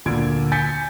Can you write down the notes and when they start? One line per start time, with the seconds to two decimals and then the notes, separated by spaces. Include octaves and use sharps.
0.06 D2 A#2 D3 G#6 D7
0.52 G#5 G6 A6 B6 C#7